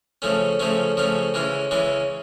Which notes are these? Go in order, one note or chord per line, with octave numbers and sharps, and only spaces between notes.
C#3 F3 A3 C#4
C#3 F3 A3 C#4
C#3 F3 A3 C#4
C#3 E3 G#3 C#4
C#3 E3 G#3 C#4